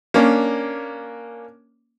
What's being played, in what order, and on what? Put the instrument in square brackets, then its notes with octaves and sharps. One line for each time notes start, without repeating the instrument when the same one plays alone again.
[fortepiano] A#3 C#4 D4